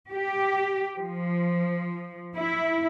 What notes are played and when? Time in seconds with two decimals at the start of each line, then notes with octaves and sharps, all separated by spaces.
0.13 G4
1.00 F3
2.37 E4